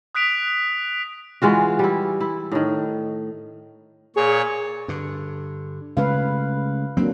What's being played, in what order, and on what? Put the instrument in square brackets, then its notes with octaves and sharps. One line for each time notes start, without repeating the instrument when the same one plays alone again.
[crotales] D#6 F#6 B6 D7 F7
[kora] E3 G#3 F4 F#4
G3 E4
E4
A2 D#3
[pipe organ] A#2 C#5 [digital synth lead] G#4
[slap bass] G2 D3
[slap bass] C#3 G#3 A3 [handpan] B4 F5
[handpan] F#3 A#3 D4 [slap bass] C4